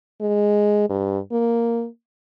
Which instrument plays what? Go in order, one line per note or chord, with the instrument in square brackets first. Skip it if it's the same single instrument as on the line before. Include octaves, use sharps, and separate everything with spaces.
[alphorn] G#3
G2
A#3